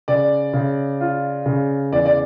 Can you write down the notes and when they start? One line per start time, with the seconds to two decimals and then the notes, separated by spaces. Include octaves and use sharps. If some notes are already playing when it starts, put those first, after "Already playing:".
0.08 C#3 D5
0.53 C#3
1.01 F4
1.46 C#3
1.92 E2 D5
2.06 D5